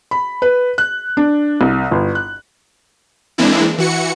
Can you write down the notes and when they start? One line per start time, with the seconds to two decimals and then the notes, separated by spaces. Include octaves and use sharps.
0.11 B5
0.42 B4
0.78 F#6
1.17 D4
1.61 C2
1.91 G1
2.15 F#6
3.38 E3 G#3 A#3 C4 D4 E4
3.78 E3 F#4 C#7